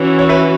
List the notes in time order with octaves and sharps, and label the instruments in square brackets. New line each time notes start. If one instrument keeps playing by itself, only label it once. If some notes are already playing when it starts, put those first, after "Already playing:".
Already playing: [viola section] E3 C#4 F#4
[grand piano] C#5
B4 E5